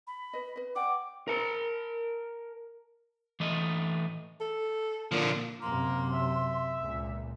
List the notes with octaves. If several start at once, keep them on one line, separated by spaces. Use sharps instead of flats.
B5
B4 D#5
B4 D#5
D5 F#5 G5 D6
A#4 A5
E3 A3 D#5
A4
A#2 D3 F3
F#2 C3 A#3 C6
E5
C#2 A#2